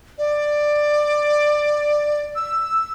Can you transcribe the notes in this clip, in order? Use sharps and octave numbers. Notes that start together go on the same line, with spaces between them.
D5
E6